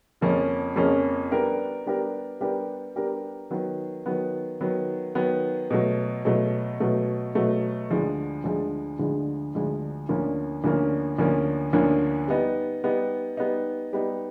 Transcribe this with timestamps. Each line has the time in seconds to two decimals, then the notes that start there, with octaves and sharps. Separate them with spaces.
0.21 F2 C#3 F3 A#3 C#4
0.76 F2 C#3 F3 A#3 C#4
1.31 G3 B3 D4 G4 A#4
1.86 G3 B3 D4 G4 A#4
2.40 G3 B3 D4 G4 A#4
2.96 G3 B3 D4 G4 A#4
3.51 D#3 F#3 B3
4.06 D#3 F#3 B3
4.61 D#3 F#3 B3
5.15 D#3 F#3 B3
5.70 B2 F#3 A3
6.25 B2 F#3 A3
6.80 B2 F#3 A3
7.35 B2 F#3 A3
7.90 D2 D3 F3 G#3
8.44 D2 D3 F3 G#3
8.99 D2 D3 F3 G#3
9.54 D2 D3 F3 G#3
10.09 D2 D3 F3 A#3 C#4
10.64 D2 D3 F3 A#3 C#4
11.19 D2 D3 F3 A#3 C#4
11.73 D2 D3 F3 A#3 C#4
12.28 G3 B3 D#4
12.84 G3 B3 D#4
13.37 G3 B3 D#4
13.93 G3 B3 D#4